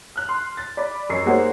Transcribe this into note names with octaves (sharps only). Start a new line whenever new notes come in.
F6 F#6
C6
A6
D5 B5
F#2 D#5 C#6 C7
G#3 A#3 D#4 F#4 C5 C#5